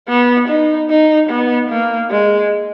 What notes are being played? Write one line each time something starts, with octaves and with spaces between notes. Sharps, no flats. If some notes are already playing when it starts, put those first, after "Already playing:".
B3
D#4
D#4
B3
A#3
G#3